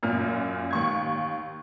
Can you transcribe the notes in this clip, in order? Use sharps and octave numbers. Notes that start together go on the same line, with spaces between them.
F#2 A#2 F6
D#2 C#6 G#6